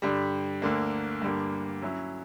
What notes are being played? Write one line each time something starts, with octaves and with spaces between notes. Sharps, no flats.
G2 D3 G3
D2 D3 A#3
G2 D3 G3 A#3
F#3 C#4 E4